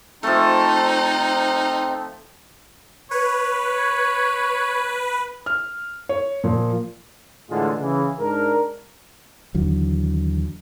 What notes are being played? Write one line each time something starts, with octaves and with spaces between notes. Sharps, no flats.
F3 A3 C4 D#4
B4 C#5
F6
C#5
A#2 F3
A2 D3 E3 G#3 F4
C#3 E3
G#2 D4 A#4
D#2 D3 E3 F#3